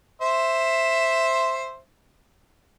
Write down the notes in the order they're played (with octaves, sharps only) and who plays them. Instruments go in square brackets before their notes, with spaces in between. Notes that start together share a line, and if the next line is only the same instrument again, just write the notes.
[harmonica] C5 E5